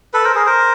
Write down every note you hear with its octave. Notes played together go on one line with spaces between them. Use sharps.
A4 B4
A#4 C5
G#4 A#4
A#4 C5